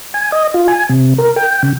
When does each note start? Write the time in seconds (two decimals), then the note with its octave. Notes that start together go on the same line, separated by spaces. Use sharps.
0.14 G#5
0.32 D#5
0.54 F4
0.68 G#5
0.89 C3
1.18 A#4
1.36 G5
1.63 C#3